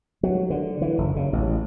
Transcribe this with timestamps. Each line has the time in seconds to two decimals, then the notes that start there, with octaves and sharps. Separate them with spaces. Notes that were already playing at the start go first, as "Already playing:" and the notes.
0.23 F#3
0.50 D3
0.81 E3
0.98 F#1
1.16 C#3
1.33 A1